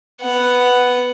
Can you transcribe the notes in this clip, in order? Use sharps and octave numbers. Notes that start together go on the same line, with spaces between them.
B3 F#5